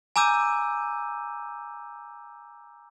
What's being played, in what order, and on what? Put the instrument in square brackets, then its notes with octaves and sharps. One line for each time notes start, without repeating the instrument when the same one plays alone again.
[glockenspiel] G#5 A#5 D6 E6 G6 D#7